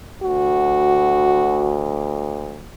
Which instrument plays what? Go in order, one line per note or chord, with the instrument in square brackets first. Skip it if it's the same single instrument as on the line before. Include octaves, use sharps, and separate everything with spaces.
[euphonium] D2 [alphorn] F#4